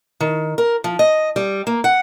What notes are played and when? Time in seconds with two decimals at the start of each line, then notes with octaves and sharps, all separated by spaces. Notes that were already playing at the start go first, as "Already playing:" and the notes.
0.20 D#3
0.58 A#4
0.84 F3
0.99 D#5
1.36 G3
1.67 A#3
1.84 F#5